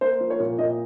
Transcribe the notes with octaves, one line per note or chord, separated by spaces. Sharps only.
A#3 C5
F3
C#5
A#2
A#2 D#5